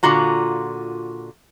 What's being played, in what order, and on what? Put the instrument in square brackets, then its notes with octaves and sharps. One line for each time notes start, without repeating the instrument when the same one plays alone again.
[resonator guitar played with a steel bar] A#2 D3 F4 F#4 A#5